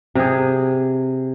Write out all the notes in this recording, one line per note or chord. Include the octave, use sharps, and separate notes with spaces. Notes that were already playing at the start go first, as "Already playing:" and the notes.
C3 G#4